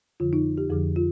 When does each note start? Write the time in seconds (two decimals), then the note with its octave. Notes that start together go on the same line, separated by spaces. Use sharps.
0.20 F2 D3 F3 F4
0.33 D#4
0.58 G4
0.70 F2 D3 F3 G#4
0.96 F4